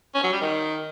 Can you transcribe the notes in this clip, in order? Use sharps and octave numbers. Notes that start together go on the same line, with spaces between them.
C#4
F#3
G3
D#3